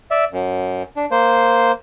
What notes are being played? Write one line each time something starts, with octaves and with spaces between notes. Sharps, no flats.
D5 E5
F#2
D4
A#3 C5